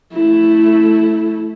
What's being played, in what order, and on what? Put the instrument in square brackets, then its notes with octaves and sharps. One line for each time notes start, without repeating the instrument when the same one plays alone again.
[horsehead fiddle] A3 E4